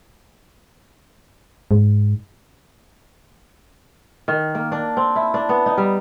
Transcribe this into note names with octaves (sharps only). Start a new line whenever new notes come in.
G#2
D#3
A#3
D4
C4
E4
D4
B3
D#4
G3